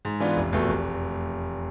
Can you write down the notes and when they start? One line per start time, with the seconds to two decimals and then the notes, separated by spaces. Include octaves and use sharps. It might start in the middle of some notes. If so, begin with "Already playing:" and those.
0.05 G#2
0.20 E3 B3 D4 F4
0.36 F1
0.53 E2 B2 A3
0.69 F1